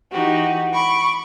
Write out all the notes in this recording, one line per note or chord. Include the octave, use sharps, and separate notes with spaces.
E3 D#4 F#4 G4
B5 C#6 D6